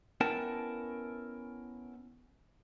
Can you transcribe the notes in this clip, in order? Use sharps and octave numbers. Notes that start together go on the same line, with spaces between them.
B3 C#4 E4 A#4 G5 A5